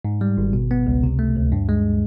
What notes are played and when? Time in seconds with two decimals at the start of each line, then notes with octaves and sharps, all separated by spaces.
0.05 G#2
0.21 G3
0.38 G#1
0.53 B2
0.71 B3
0.87 C#2
1.03 C3
1.19 A3
1.36 D2
1.52 G2
1.69 G#3